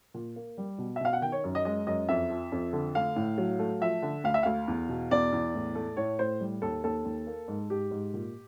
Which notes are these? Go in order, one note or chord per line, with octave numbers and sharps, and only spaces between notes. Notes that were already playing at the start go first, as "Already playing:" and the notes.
A#2
A#3
G3
B2
E5
B2 F5
F#5
D#3 G5
C#5
F#2
D#5
G#3 D#5
F#2 D#5
F2 E5
F3
F2
D3
A3 F5
A2
F#3
A3
F3 E5
D3
D2 F5
E5
D2 F5
E2
B2
E2 D5
E2
A2
A3
A2 C#5
A2 C5
G3
D#2 A4
D#2 A4
D#2
A#3
G#2
G#2 G4
G#2
A#2